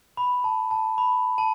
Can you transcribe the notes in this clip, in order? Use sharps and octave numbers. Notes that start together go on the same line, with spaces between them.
B5
A5
A5
B5
A5